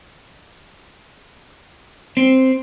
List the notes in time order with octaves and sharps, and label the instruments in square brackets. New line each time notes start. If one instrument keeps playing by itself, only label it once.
[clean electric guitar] C4